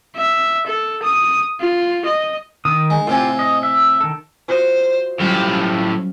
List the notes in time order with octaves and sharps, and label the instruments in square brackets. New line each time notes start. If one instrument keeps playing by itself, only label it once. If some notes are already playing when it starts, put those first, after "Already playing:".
[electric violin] E5
A4
D#6
F4
D#5
[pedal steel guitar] D#3 D#6
[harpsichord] G#3
[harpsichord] A2 C3 G#5 [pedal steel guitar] F4 G4
[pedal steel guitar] D#5
E5
D#3 A4
[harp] F4 F#4 D#5 [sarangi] C5
[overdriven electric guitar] A2 G4 [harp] F#3 G3 C#4 [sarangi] F4